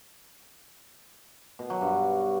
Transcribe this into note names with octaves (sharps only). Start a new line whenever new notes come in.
B2
F#3
G2